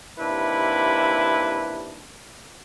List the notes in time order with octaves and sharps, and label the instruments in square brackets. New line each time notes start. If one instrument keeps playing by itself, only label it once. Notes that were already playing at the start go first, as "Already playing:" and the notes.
[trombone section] D#2 C3 D4 E4 B4